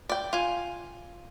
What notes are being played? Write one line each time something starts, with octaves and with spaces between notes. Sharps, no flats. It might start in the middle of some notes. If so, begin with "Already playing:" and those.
D5 G5
F4 G#5